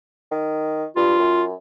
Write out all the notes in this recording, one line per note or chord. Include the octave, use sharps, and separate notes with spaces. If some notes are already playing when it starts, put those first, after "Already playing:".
D#3
G2 F4
F#2